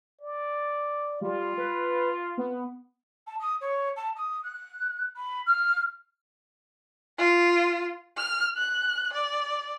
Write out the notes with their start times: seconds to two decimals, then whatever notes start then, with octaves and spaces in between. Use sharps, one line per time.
0.21 D5
1.21 G3 F4
1.58 B4
2.38 B3
3.26 A5
3.39 D#6
3.60 C#5
3.96 A5
4.15 D#6
4.43 F#6
5.16 B5
5.46 F6
7.18 F4
8.17 F6
8.56 F#6
9.13 D5